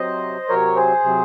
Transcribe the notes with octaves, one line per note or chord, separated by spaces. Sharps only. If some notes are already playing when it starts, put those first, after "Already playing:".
Already playing: C3 F#3 C5 D#5
C3 F#3 A#4 C#5
G#4 C5
C3 F#3